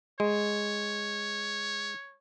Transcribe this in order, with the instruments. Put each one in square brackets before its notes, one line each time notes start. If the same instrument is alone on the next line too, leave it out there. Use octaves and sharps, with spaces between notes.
[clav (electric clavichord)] G#3 [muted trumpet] C#5